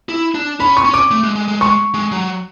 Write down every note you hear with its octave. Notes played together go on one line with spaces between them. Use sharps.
E4
D4
C#4 B5
C#6
C#4
D6
A3
G#3
G#3
G#3
G#3 C#6
G#3
F#3